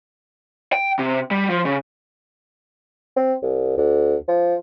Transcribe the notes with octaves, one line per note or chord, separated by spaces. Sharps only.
G5
C3
G3
F3
C#3
C4
C2
D2
F3